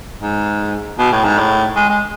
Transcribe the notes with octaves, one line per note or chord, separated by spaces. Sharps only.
G#2
B2
A2
G#2
A2
G#3
G#3